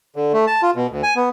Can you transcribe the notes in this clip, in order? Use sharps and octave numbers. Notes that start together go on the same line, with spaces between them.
D3
A3
A5
F4
B2
D2
G#5
B3